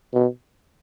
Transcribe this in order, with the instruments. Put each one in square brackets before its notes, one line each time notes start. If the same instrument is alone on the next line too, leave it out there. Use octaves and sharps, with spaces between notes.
[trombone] B2